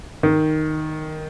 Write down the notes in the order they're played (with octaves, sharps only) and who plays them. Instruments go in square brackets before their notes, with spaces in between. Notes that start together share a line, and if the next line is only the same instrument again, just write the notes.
[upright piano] D#3